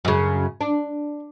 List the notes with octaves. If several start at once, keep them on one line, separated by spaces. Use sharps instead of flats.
F#2 C#3
D4